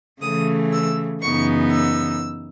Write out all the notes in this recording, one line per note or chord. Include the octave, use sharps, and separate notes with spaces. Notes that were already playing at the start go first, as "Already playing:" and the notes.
C#3 E3 A3 D#6
E6
F#2 C#3 E3 B3 D#4 C#6
E6